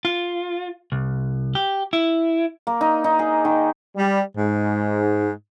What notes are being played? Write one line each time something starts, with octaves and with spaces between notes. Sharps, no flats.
F4
C2
G4
E4
A#3
D#4
D#4
G#4
D#3
G3
G#2